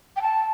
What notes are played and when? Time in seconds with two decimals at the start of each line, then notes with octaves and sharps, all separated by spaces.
0.16 G5
0.22 A5